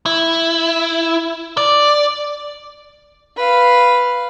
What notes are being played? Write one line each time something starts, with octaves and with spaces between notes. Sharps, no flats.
E4
D5
B4 F5